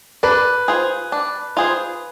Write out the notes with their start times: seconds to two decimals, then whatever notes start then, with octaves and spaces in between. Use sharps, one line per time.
0.23 D4 B4
0.68 F4 G#4 C5
1.12 D4
1.57 F4 G#4 C5